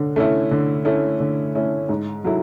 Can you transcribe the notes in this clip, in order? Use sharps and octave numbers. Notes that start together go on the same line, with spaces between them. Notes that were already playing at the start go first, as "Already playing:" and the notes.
Already playing: D3 C#4
A3 C#4 E4
D3
A3 C#4 E4
D3
A3 C#4 E4
G#2
F#3 A3 E4